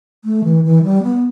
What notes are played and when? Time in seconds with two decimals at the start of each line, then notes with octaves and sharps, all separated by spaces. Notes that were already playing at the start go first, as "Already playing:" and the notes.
0.25 A3
0.44 E3
0.64 E3
0.83 G3
1.03 B3